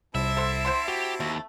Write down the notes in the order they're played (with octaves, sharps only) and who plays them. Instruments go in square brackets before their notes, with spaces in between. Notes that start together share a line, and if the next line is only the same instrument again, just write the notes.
[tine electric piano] C2 [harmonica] C4 E4 A5 [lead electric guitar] E5
[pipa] A4 C5 F#5
C5 F#5 C6
[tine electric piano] F#4 [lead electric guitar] G4
[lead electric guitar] D#2 [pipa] A3